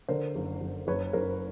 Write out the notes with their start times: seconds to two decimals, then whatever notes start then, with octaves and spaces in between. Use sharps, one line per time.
0.08 D3 A#4 C5
0.35 F#1
0.61 F#1
0.87 F#1 B4 C#5
1.13 F#1 A#4 C5